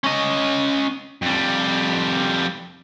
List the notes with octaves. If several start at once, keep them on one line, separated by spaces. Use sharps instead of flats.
C#4 D#5
F2 G3